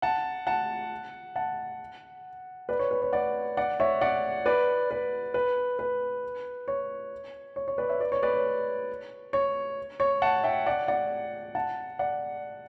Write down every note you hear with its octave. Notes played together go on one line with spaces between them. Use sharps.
F#5 A5
F#5 A5
F#5 A5
B4 D5
C#5
B4
C#5
D5 F#5
D5 F#5
C#5 E5
D5 F#5
B4 D5
B4
B4
B4
C#5
C#5
C#5
B4 D5
C#5 E5
B4 D5
C#5
B4 D5
C#5
C#5
C#5
F#5 A5
E5 G5
D5 F#5
D5 F#5
F#5 A5
D5 F#5